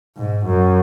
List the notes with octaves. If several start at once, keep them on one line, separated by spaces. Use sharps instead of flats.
G#2
F#2